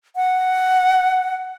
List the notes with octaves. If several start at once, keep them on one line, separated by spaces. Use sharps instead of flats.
F#5